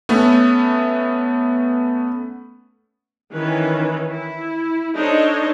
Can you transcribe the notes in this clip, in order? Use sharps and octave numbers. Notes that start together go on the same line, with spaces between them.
A3 B3 C#4
D#3 E3 C#4 B4
E4
D4 D#4 A4 C5 C#5 D#5